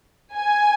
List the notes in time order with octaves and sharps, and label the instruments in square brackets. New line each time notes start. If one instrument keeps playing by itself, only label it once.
[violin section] G#5